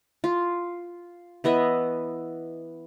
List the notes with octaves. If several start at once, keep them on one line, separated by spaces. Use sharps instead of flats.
F4
E3 B3 D#5 E5